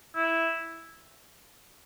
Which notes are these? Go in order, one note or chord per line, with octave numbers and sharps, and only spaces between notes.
E4